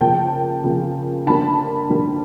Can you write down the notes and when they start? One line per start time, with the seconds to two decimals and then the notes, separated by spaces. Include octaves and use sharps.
0.01 C#3 F3 A#3 G5 A5
0.64 C#3 F3 A#3
1.27 D3 G3 A#3 A5 B5
1.90 D3 G3 A#3